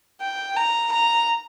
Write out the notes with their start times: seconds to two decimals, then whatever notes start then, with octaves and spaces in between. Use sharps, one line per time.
0.21 G5
0.56 A#5
0.92 A#5